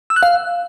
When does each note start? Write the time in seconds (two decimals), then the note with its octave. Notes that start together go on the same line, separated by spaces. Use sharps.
0.10 E6
0.16 F#6
0.23 F5